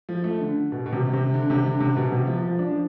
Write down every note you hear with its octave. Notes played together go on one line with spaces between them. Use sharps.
F3
A3
D3
B2
B2
C3
C3
D3
C3
D3
C3
B2
C3
F3
F3
D4
F3